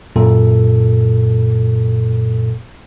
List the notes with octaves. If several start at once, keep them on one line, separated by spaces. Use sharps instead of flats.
F#2 A#2 A4